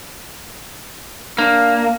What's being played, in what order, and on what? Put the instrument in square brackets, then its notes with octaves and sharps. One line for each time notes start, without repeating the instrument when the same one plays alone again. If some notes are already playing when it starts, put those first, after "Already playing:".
[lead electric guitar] A#3 [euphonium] D4